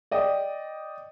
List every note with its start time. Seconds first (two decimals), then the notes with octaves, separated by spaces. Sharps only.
0.11 D5 D#5 G5